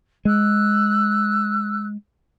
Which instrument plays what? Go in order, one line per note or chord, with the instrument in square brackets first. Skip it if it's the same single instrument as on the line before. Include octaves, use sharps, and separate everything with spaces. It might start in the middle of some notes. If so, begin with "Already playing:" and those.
[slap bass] G#3 [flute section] E6 F#6